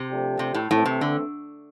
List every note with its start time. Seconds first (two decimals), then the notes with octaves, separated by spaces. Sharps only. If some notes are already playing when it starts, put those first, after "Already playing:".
Already playing: C3
0.08 F3 A3 D4 G4
0.39 C3
0.54 A2
0.71 A2 E3 A3 C4
0.86 C3
1.01 D3